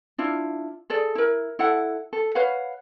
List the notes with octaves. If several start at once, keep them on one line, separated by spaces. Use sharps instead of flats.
D4 E4 F4
G#4 A4 D5
E4 A#4
E4 A4 F#5
A4
B4 C#5 F5 F#5